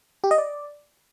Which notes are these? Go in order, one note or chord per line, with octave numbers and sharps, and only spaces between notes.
G4
D#5
D5